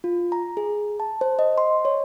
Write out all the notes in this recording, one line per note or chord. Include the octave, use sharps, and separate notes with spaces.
F4
A#5
G#4
A5
C5
D#5
C6
C#5